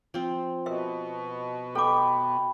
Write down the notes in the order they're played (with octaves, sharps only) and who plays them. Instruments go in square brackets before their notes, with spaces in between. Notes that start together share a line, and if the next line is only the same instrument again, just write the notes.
[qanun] F3 C4
[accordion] B2 [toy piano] A#4 E5
[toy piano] A4 D6 [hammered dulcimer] G5 B5